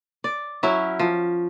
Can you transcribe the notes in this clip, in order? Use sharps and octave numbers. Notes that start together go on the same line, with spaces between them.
D5
F#3 C#4 E4
F3